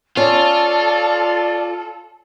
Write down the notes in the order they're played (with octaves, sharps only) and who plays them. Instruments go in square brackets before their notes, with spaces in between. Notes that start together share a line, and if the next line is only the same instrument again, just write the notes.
[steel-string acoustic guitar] C#4 [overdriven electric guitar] F4 [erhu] A4 [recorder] D5